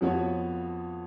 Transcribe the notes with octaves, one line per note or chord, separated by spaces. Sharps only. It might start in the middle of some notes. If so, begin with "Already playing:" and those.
F2 F3 B3 F#4 C#5